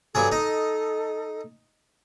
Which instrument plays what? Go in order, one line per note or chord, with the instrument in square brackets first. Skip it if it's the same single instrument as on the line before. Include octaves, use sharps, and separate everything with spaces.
[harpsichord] G2 F#3 G#4 [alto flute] A4
[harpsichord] D#4 D#5